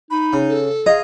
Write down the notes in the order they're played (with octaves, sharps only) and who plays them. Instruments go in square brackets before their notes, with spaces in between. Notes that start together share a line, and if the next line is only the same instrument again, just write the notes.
[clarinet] D#4 [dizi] B5
[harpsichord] C#3
[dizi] A4
[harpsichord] F4 A#5 [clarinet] G#4 [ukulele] D#5